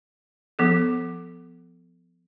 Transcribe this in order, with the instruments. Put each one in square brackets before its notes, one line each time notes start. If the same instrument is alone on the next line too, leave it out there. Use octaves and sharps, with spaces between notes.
[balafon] F3 B3 A4